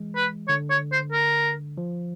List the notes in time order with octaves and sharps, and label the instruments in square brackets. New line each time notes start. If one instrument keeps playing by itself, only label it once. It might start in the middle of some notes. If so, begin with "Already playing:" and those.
Already playing: [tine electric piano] E3 G#3
[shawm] B4
[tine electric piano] D3 [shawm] C#5
[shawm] C#5
C5
A#4
[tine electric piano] F3